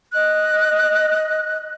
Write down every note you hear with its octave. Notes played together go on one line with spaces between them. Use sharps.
D#5 F#6